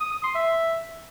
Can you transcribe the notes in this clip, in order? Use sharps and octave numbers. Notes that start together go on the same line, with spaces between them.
D#6
D#6
C6
E5